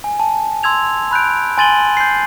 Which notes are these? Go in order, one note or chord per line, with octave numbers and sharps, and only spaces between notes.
G#5
A5
C6 E6 G#6 F7
B5 F#6 G6 D7
G#5 C6 A6 D#7 F#7 G7
G6 C7